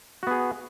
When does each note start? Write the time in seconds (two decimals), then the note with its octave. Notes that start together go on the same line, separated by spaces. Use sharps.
0.23 F#4
0.27 B3
0.31 G#4